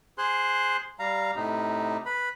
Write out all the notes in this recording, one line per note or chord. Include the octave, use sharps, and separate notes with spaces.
G#4 C5 C6 F#6
G3 F5 A#5
A2 C3 D#4
B4 B5